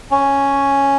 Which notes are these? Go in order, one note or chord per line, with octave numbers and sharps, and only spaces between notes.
C#4